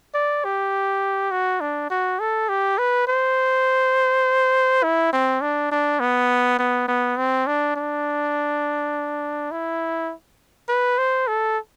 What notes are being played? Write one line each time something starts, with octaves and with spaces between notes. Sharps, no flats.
D5
G4
F#4
D4
F#4
A4
G4
B4
C5
E4
C4
D4
D4
B3
B3
B3
C4
D4
D4
E4
B4
C5
A4